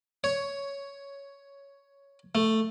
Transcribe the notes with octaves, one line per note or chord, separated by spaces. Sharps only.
C#5
A3